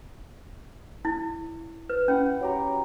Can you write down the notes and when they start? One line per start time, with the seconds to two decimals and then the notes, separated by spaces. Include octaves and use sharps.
1.05 E4
1.90 B4
2.08 C#4 E4 F#5
2.41 F#3 G4 A#5